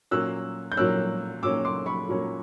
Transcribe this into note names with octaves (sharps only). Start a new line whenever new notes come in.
A#2 F#3 A#3 C#4 E6 F#6
G6
A#2 F#3 A#3 C#4 E6 F#6
A#2 F#3 A#3 C#4 D6 E6
C6 D6
B5 C#6
A#2 F#3 A#3 C#4